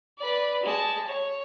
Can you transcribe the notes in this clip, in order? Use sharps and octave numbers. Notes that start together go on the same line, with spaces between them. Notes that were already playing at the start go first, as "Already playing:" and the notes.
B4 D5
G#3 A5
C#5